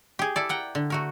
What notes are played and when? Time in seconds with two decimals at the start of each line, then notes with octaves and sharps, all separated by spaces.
0.19 G4 G#4
0.36 E4 A4 D5
0.49 A#4 F#5 G5
0.75 D3
0.90 A3 F#4 A#4